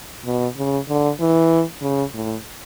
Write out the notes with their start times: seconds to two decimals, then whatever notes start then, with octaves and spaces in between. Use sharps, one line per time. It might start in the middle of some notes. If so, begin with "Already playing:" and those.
0.25 B2
0.57 C#3
0.89 D3
1.20 E3
1.82 C#3
2.14 A2